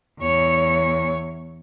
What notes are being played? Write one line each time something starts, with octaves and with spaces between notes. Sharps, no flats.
E2 C#5